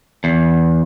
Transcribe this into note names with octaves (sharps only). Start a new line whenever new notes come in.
E2